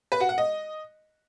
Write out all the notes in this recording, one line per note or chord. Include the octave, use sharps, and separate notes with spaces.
B4
F#4
F#5
D#5